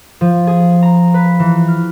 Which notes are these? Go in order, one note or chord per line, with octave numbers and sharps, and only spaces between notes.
F3
G#4
A#5
B4
E3
F6